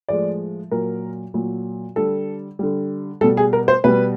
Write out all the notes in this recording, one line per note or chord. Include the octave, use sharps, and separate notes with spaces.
A2 F3 G#3 D5
A#2 F#3 A#4
A#2 F#3
D3 G3 A4
D3 G3
B2 G3 A4
G#4
A#4
C5
B2 G3 B4